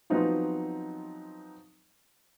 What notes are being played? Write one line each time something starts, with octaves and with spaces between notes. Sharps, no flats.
F3 F#3 B3 C4 D#4 F4